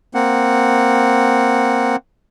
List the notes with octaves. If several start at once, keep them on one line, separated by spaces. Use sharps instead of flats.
A#3 C4 F#5